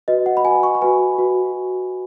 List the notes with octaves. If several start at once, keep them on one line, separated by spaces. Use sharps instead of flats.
F#4 B4 D#5
F#5
B5
F#4 B4 G#5
C#6
B5
F#4 B4 G#5
F#4 B4